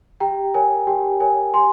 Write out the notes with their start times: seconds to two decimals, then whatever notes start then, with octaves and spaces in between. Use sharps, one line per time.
0.20 G4 G5 A#5
0.54 A#4 C#5 G#5
0.87 G4 G5
1.20 A#4 C#5 G#5
1.54 G4 G#5 C6